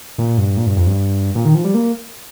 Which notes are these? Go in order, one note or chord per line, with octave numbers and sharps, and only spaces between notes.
A#2
G2
A#2
G2
F2
G2
A#2
D#3
F3
G3
A#3